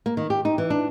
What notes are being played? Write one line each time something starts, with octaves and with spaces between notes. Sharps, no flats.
A#3
D#3
G4
D#4
E3
D4